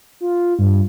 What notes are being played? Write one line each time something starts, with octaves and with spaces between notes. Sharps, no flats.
F4
G2